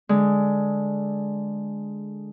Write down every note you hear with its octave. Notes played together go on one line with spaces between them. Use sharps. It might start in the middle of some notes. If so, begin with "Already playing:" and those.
D3 G#3